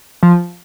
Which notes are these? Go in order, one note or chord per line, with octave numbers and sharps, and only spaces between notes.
F3